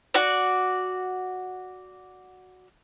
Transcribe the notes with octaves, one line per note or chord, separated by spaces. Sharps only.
F#4 D5